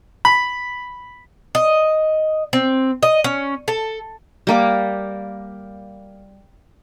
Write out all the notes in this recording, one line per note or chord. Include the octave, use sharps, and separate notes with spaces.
B5
D#5
C4
D#5
C#4
A4
G3 A#3 D6